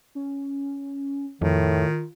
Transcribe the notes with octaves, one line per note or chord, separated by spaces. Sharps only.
C#4
F2 A2 D#3 F4